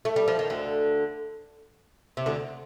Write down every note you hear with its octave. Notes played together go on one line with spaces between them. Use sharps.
A3
G3
F3
D#3
D2 D3
C3
D2 D3